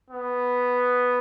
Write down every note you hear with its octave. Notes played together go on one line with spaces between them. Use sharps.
B3